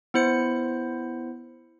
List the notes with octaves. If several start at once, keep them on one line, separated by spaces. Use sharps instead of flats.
B3 E4 C5 C#7